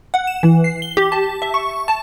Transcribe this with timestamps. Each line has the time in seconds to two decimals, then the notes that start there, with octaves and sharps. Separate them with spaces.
0.14 F#5
0.27 E7
0.43 E3
0.64 C7
0.82 G7
0.97 G4
1.12 A5
1.42 E5
1.54 C#6
1.88 A5